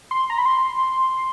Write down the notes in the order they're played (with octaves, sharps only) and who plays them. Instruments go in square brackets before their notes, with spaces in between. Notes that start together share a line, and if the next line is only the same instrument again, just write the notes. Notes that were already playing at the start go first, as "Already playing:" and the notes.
[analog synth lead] C6
A#5
B5
C6